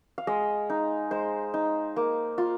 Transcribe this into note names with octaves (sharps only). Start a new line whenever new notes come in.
F5
G#3 D#5
D#4
G#3 C5
D#4
A#3
F4